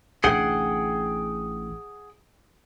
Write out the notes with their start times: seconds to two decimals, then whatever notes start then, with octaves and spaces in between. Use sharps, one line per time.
0.24 A1 D4 G#4 F#5 G5